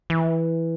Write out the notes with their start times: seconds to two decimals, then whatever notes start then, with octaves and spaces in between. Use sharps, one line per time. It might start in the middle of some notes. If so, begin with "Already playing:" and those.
0.10 E3